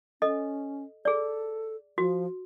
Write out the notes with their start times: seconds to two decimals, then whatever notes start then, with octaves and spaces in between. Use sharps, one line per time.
0.22 C#4 A4 D#5
1.05 G#4 A4 D5
1.98 F3 F#4